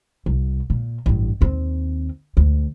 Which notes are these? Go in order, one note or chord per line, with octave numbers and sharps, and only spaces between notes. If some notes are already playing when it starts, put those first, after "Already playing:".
C2
A#2
A1 G2
D#2 C4
D2